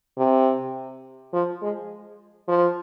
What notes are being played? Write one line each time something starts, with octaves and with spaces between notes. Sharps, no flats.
C3
F3
G#3
F3